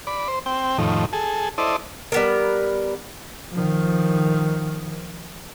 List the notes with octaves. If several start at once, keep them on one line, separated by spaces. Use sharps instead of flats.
D5 B5
C5
C4 G5
F2 A2 D#3
G#4 A4
E4 A4 C5 D5 D#5
G3 B3 A#4
D#3 F3